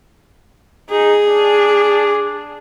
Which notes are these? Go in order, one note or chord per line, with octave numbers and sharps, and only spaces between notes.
D#4 G#4
D4